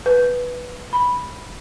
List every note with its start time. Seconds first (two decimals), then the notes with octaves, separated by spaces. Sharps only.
0.06 B4
0.93 B5